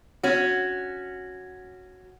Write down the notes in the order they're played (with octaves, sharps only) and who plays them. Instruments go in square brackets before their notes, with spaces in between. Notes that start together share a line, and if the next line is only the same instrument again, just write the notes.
[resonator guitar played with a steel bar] C#4 F#4